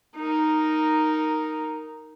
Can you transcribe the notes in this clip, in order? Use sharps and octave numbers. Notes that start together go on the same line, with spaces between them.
D#4 A#4